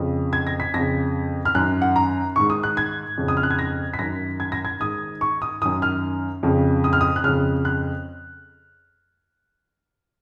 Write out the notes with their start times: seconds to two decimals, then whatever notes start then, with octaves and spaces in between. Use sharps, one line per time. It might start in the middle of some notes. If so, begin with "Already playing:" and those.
Already playing: F2 C#3
0.33 G#6
0.47 A#6
0.60 B6
0.74 F2 C#3 A#6
1.45 F6
1.55 F#2 D#3 F#6
1.82 F#5
1.96 A#5
2.36 G#2 D#3 C#6
2.50 D#6
2.63 F#6
2.77 G#6
3.18 F2 C#3
3.28 D#6
3.37 F6
3.43 F#6
3.50 G#6
3.59 A#6
3.94 B6
3.99 F#2 D#3 A#6
4.40 G#6
4.52 A#6
4.65 G#6
4.80 G#2 D#3 D#6
5.21 C#6
5.42 D#6
5.62 F#2 D#3 D#6
5.82 F6
6.43 F2 C#3
6.84 D#6
6.93 F6
7.01 D#6
7.16 F#6
7.24 F2 C#3 F6
7.65 F#6